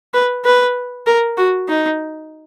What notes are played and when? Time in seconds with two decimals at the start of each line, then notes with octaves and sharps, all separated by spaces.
0.14 B4
0.45 B4
1.07 A#4
1.37 F#4
1.69 D#4